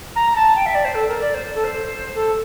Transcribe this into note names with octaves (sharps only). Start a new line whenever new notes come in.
A#5
A5
G5
E5
D5
C5
A4
A#4
D5
C5
A4
C5
A4